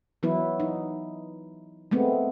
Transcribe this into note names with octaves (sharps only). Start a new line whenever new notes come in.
E3 F#3 B3 E4 B4
D#4
G#3 A3 B3 C4